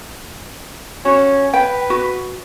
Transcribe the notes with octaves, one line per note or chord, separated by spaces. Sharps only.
C#4 F#4
B4 G5
F#4